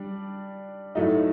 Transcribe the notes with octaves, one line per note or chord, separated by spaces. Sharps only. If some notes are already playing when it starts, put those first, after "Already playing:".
Already playing: G3 D4
A2 F#3 A3 D#4